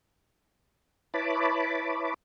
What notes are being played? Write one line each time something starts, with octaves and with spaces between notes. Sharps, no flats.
E4 B4 C#5 A5 B5 D6